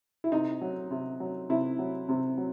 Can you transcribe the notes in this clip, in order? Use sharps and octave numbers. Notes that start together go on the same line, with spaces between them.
E4
C3 D#4
F#3
C3
F#3
C3 E4
F#3
C3
F#3